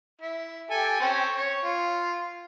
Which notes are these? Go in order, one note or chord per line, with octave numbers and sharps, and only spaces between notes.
E4
G4 A4 G#5
C4 C#4
C#5
F4